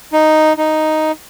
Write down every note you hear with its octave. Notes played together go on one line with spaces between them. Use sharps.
D#4
D#4